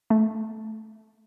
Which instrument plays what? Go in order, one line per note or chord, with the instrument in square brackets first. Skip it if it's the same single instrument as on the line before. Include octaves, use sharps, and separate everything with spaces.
[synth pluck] A3